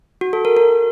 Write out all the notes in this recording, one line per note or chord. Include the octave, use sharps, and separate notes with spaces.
F#4
A4
A#4
A#4